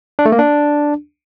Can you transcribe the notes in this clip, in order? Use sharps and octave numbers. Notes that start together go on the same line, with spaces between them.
D4
A3
A#3
D4